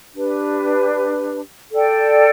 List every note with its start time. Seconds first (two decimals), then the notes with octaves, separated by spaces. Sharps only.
0.14 D4 G4 B4
1.72 A4 D5 G5